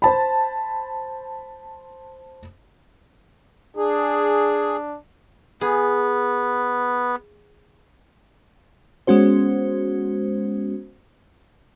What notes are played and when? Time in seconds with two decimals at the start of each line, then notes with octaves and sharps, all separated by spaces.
0.02 C5 A5 B5
3.77 D4 G#4
5.61 B3 G#4
9.07 G#3 B3 C#4 F#4 C5